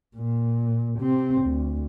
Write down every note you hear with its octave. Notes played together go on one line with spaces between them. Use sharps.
A#2
C3 C4
D2